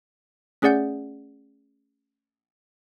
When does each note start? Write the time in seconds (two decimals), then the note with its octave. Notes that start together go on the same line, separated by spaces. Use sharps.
0.62 A3 C#4 G#4 D5 F#5 G6